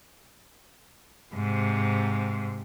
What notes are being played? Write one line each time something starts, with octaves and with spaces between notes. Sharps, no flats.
G#2 C3